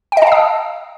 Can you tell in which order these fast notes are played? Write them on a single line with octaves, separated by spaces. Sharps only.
G5 D#5 A5 F5 D#6